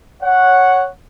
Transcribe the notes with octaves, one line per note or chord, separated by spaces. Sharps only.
C#5 F#5